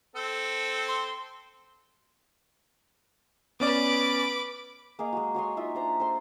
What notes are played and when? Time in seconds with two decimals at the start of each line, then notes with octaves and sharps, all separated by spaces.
0.16 C4 A4
0.88 C6
3.60 B3 C#4 B4 D5 D6
4.99 A#3 G#4 D#5 F5
5.13 G#3 F#4
5.35 F#4 C#5 D#5 C6
5.57 D#4 F4 E5
5.75 D4 C5 A#5
6.00 C5 C6